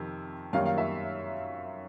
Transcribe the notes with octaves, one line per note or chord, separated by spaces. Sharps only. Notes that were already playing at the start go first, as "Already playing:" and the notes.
Already playing: F2 C3 D#3
F#2 D#3 G3 A#3 F5
F5
E5